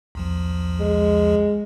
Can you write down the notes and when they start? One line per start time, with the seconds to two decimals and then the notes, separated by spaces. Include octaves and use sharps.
0.15 B1 E2 F3
0.80 G#3